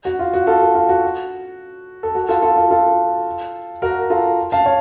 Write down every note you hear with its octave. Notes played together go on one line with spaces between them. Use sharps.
F#4
F4
F#4
F4 A4
F#4
F4
F#4
A4
F#4
F4 A4
F4 A4
F4
F4 A4
F#4 A#4
F4 A4
F5 A5
C#5 F5